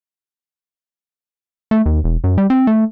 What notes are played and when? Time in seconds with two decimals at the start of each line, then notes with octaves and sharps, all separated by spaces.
1.71 A3
1.86 D#2
2.04 E1
2.24 F#2
2.38 G3
2.50 C4
2.67 A3